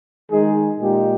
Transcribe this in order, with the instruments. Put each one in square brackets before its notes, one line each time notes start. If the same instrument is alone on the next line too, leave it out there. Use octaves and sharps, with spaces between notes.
[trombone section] D#3 G#3 D#4 G#4
A#2 G#3 D#4 G4